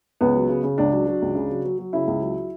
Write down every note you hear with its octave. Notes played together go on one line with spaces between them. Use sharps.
C#2 B3
F#3
C#3
C#3
C#2 D4
F#3
F#3
C#2
C#3
F#3
F#3
F#3
C#3 E4
C#2
F#3